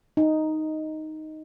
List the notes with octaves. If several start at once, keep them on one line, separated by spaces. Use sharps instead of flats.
D#4